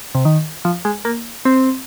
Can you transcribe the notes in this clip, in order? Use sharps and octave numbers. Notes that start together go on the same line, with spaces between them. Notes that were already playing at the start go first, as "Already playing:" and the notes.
C3
D#3
F3
G#3
A#3
C4